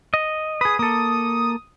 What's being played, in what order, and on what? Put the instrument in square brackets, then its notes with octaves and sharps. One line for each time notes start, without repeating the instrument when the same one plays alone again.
[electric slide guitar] D#5
[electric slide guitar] G#4 B4 [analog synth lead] D#6
[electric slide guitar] A#3 A4 [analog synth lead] D#6